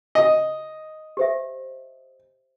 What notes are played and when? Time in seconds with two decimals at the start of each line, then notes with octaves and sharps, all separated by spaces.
0.15 D#5
1.17 G4 C5 E5